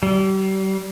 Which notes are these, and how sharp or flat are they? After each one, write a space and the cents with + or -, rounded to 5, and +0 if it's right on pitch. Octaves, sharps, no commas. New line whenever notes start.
G3 -35